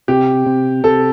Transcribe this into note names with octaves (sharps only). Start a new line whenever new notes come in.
C3 G4
C3
C3 A4